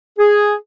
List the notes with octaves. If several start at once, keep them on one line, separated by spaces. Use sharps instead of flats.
G#4